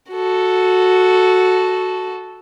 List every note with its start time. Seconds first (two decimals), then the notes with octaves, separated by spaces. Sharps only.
0.11 F#4 A4